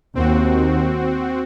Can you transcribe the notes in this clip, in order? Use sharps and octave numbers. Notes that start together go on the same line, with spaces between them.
D#2 C4 F#4